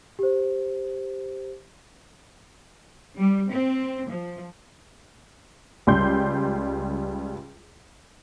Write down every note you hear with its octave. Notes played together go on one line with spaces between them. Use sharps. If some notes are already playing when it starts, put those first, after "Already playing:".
G4 C5
G3
C4
F3
C#2 G3 C6 G6